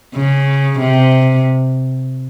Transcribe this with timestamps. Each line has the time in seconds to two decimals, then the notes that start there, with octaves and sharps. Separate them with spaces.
0.14 C#3
0.80 C3